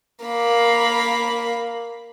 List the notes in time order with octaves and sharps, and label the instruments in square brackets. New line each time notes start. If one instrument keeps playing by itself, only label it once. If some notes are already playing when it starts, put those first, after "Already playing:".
[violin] A#3 B5